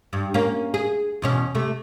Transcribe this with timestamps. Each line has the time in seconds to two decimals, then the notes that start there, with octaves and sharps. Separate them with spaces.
0.13 G2
0.34 A#3 C#4
0.74 G#4
1.22 E2 B2 C#4
1.55 C3 A3